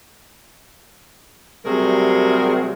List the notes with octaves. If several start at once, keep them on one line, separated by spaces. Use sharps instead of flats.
C3 F#3 G3 A3 G#4 A#4